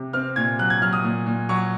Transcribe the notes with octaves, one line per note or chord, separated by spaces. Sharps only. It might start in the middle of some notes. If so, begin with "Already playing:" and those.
Already playing: C3
C4 F6
A#2 G#6
F#3 F#6
G#6
F#3 F6
D#6
A#2
A#2
F#3 C#6